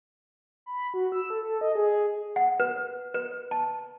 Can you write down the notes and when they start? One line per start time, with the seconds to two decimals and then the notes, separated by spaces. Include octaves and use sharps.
0.66 B5
0.94 F#4
1.12 E6
1.30 A4
1.43 A4
1.61 D#5
1.75 G#4
2.36 F#5
2.60 B4
3.14 B4
3.51 A5